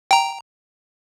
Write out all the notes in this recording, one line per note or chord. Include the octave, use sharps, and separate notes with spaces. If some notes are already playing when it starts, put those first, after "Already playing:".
G5 A#5